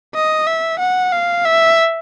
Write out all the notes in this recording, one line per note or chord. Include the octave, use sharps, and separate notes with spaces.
D#5
E5
F#5
F5
E5